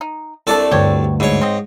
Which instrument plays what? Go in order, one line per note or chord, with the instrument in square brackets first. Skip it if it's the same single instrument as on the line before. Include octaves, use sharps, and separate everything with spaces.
[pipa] D#4
[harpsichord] C2 A4 D5 [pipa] A3 D4
[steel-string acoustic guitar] D2 G2 [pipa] G4 C#5
[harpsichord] G#2 C#5 [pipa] E3
[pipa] C4 D#5